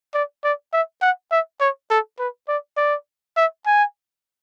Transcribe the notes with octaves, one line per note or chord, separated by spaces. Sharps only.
D5
D5
E5
F#5
E5
C#5
A4
B4
D5
D5
E5
G#5